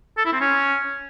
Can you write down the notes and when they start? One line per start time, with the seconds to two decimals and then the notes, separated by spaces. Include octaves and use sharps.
0.17 A4
0.25 E4
0.33 C4
0.41 C#4